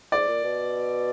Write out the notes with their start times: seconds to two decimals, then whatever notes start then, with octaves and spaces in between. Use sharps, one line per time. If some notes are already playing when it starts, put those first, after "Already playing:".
0.12 G#2 D5
0.28 A#2
0.44 B2